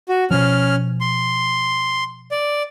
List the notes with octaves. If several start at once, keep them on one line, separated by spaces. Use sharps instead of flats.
F#4
B2 F3 C#4 F6
C6
D5